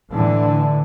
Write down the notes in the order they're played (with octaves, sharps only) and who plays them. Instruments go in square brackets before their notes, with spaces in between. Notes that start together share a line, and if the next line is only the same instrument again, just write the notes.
[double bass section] A2 D3 E3